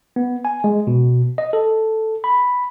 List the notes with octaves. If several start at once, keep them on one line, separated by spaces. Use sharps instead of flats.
B3
G#5
G#3
B2
D#5
A4
B5